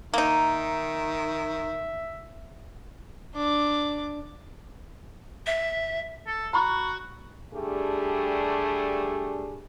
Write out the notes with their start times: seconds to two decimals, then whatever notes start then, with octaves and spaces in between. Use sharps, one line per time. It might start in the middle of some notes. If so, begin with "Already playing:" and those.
0.14 D#3 A#3 D#4 E5
3.35 D4 D6
5.46 E5
6.27 A4
6.53 F#4 A#5 B5 C#6
7.54 G3 A3 D4 G4 G#4